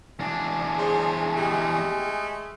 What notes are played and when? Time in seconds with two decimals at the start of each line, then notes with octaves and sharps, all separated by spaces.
0.19 E2 D4 G#5
0.79 G#4 C5 C#5 A5
1.37 G#3 A3 G4 G#4